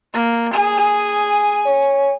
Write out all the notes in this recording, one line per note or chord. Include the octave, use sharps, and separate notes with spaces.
A#3
G#4 G#5
C#5